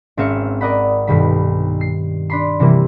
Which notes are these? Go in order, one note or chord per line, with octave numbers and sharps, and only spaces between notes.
G#1 C4 C#4 E5 F5 C#7
A#4 D5 D#5 F#5 B5
B1 G2 D#3 G3 B5
C7
D4 B5 C6
C3 E3 G3 A#3